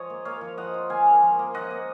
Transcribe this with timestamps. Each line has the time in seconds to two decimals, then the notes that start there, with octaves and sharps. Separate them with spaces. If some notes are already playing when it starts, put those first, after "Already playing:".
Already playing: F3 C#5 D#5
0.10 A#3
0.25 A#3 C#5 F5
0.41 F3
0.57 F3 D#5 F#5
0.74 F4
0.89 A#3 F5 G#5
1.06 A#3
1.22 F3
1.39 A#3
1.54 F3 D#5 F#5
1.70 A#3